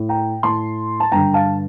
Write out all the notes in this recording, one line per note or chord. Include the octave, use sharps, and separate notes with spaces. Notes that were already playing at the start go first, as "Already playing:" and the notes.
Already playing: A2
G5 A#5
A2 A5 C6
A5
G2 D3 G5 A#5
F5 A5